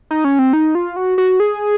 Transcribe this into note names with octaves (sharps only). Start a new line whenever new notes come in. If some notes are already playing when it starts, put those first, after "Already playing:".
D#4
C#4
C4
D#4
F4
F#4
F#4
G#4